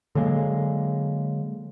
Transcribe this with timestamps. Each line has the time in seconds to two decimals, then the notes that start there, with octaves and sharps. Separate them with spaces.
0.15 D3 F#3 G#3 A#3